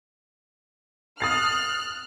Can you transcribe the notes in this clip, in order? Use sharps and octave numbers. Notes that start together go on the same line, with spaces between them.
D#6 F6 F#6 A6 C7